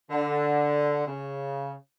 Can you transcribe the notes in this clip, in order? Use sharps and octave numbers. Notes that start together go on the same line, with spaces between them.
D3
C#3